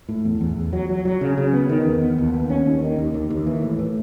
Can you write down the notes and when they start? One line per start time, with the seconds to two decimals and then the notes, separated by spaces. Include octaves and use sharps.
0.09 A2
0.25 E2
0.41 E2
0.57 E2
0.73 F#3
0.89 F#3
1.05 F#3
1.21 C#3
1.38 C#3
1.53 B3
1.69 D#3
1.86 E2
2.02 B3
2.18 D#2
2.34 D#2
2.50 C#4
2.66 D#2
2.82 D#3
2.98 D#2
3.14 D#2
3.30 D#2
3.47 E3
3.62 A2
3.79 A2